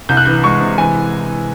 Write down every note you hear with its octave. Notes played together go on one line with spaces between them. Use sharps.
C2 G6
F#6
E3 G6
G#3 C#6
C3
E3 G#5